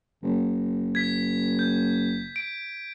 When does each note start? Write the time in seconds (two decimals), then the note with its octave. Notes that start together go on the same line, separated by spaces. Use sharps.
0.23 F#1
0.95 G#6 B6
1.59 G6
2.36 D7